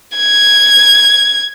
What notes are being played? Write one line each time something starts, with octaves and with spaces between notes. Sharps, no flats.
G#6